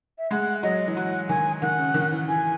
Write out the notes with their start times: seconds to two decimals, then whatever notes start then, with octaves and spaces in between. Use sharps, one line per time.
0.18 E5
0.31 G#3 F#5
0.63 F#3 D#5
0.87 E3
0.96 F#3 F#5
1.29 D#3 G#5
1.61 D#3 F#5
1.78 C#3
1.94 D#3
2.12 E3
2.28 E3 G#5